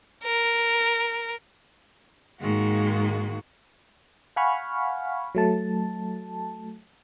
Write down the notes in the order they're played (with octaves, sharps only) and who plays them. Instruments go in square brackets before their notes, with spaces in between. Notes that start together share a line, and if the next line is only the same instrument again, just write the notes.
[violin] A#4
[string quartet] G#2 D#3 G#3 A#3 F#4
[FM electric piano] F5 F#5 G#5 B5 C#6 F6
F#3 A3 A5